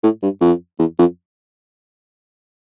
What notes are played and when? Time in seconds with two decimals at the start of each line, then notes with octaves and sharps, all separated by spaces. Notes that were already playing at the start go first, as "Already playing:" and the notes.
0.03 A2
0.23 G2
0.41 F2
0.79 E2
0.99 F2